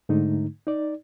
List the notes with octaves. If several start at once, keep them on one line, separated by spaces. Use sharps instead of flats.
G#2 D3 A3 D#4
D#4 D5